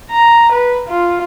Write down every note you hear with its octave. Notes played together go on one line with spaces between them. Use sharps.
A#5
B4
F4